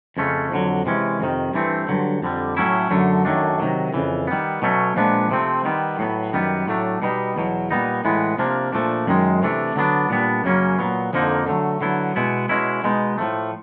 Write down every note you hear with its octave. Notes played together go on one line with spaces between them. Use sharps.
F2 C#3 F3 A3 C#4
F2 D3 F#3
C3 E3 G#3 C#4
F2 C3 D#3
G2 E3 A3 C4
G2 D3 F#3
F2 D3 G3
A2 F#3 A3 C#4 E4
F#2 D3 F#3 A3
F#2 D#3 F#3 A3 D4
C3 D#3 F#3
F2 C#3 E3
D#3 G3 B3
B2 F#3 A3 C#4
A#2 F3 G#3 B3 D4
C3 F3 A3 C4
D#3 G3 B3
A2 F#3 B3
F#2 D#3 G3 B3
A2 F#3 A3 D4
B2 G3 B3 D#4
E2 B2 F#3
A#2 G3 B3 D#4
A2 E3 G#3 B3
C3 F3 A#3 D4
A#2 F3 A3 D4
F#2 D#3 G#3
C3 E3 A3 D4
D3 F#3 B3 D4
A#2 G3 B3 D4
F#2 C#3 F#3 A#3 C#4
A#2 F#3 B3
F2 D3 F3 A#3 D#4
D3 F#3 A3
D3 F#3 B3 E4
B2 G#3 B3 E4
B2 G#3 C#4 E4
B2 G#3 B3 D#4
A2 F3 A3